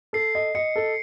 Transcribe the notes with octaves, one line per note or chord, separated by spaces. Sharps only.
A4 C7
D#5
D#5 C#7
A4